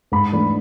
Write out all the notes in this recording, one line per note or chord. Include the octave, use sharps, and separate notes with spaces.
G#2 B5
E3 A3 D4